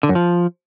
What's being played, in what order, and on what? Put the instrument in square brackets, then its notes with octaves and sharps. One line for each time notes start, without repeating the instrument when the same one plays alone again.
[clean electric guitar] D3
F#2
F3